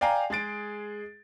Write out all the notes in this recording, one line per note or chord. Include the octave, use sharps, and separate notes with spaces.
D5 F5 G5 G#5 A#5
G#3 G#4 A6 D7